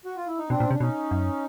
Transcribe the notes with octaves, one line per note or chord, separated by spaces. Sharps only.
F#4
F4
E4
D#4
B2 C4 D4
A#2
C#4
C3
D4
B2 C#4 D#4
F#2